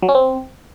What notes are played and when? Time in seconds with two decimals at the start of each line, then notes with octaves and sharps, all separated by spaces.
0.03 F#3
0.09 C#4
0.15 C4